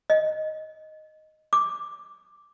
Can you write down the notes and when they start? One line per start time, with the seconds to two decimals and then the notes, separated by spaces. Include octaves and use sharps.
0.10 D#5
1.53 D6